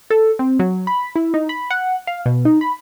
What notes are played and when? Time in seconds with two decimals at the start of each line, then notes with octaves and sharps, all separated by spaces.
0.10 A4
0.39 C4
0.59 F#3
0.87 B5
1.16 E4
1.34 D#4
1.49 B5
1.70 F#5
2.07 F5
2.26 B2
2.45 D#4
2.61 B5